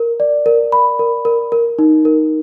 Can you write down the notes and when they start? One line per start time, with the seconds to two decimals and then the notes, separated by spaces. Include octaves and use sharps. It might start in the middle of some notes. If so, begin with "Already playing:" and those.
Already playing: A#4
0.20 D5
0.46 A#4
0.72 B5
0.99 A#4
1.25 A#4
1.52 A#4
1.79 D#4
2.05 A#4